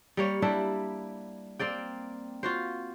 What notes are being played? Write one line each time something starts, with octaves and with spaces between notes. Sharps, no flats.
G3 A#3 C#5
G3 D4 E4 E5
A#3 C4 D5 G5
F4 F#4 C5